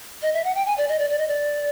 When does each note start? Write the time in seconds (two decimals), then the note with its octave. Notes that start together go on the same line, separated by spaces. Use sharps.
0.22 D#5
0.34 E5
0.44 F#5
0.56 G5
0.66 G#5
0.78 D5
0.89 D#5
0.99 D5
1.10 D5
1.18 D#5
1.28 D5